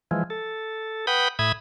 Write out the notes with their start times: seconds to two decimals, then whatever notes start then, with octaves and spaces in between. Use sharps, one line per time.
0.11 E3 F3 G#3
0.30 A4
1.07 B4 F#5 G5 B5 D#6 G6
1.39 A2 E5 B5 D#6 G#6